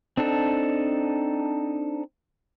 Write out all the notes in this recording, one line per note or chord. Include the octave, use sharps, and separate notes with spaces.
C4 D4 D#4 A4